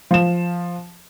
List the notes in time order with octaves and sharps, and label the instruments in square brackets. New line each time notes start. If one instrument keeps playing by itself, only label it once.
[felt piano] F3 E7